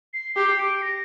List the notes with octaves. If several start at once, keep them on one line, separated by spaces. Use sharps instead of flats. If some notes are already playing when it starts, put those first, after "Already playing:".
C7
G4 C7
D7
A#6